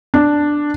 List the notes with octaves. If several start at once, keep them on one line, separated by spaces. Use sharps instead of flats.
D4